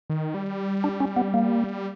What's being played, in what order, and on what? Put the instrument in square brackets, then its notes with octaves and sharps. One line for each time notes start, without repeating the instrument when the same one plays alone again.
[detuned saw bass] D#3
G3
[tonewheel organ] D4
C#4
B3
A#3